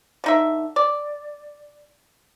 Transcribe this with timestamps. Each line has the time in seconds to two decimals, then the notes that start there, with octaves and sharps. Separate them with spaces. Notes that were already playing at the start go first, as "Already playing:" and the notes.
0.24 D3 D#4 E5
0.76 D5